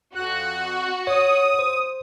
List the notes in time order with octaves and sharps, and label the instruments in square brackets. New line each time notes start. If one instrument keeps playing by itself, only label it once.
[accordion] F2 F#6 [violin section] F#4
[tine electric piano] C#5 [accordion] D#6
[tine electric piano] C5